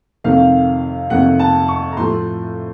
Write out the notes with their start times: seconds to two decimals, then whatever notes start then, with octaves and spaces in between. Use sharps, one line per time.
0.24 F2 C3 D#3 A3 F5
1.10 F2 C3 D#3 A3 F#5
1.39 A5
1.68 C#6
1.92 A#5
1.97 A2 F3 A3 C6